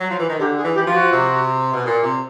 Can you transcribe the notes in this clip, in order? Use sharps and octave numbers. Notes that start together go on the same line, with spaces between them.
F#3
F3
E3
D#3
D3 G4
G#4
E3
G4
E3
F3
F#4
C3
B2
A#2
C3